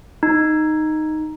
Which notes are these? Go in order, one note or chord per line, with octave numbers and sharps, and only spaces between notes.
D#4